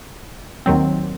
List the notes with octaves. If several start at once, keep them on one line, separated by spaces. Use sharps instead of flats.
D#2 D#3 F#3 C4